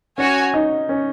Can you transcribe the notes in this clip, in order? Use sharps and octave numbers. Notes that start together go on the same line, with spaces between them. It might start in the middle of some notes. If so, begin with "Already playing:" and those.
C#4 F#4 C#5 G#5
D#4
C#4